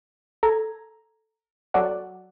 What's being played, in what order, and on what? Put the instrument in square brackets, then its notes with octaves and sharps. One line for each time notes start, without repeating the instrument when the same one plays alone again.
[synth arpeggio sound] A4 A#5 G#6
F#3 F#4 A4 D5 F#5